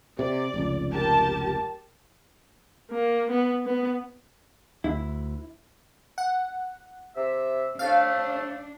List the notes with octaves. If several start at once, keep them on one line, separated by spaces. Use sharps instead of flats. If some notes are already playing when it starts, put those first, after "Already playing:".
C3 D5
F1 C#2
G4 A#4 A5
A#3
B3
B3
D2 E4
F#5
C3 E5
A2 C3 A3 D4 F5